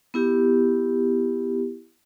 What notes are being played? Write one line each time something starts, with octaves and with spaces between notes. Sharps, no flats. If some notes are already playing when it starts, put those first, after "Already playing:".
B3 E4 G4